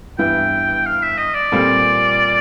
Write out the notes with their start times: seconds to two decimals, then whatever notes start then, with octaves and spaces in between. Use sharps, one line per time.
0.18 G2 E3 G3 B3 E4 G5
0.86 F5
1.02 E5
1.18 D#5
1.34 D5
1.52 A#2 G3 C4 F4 A4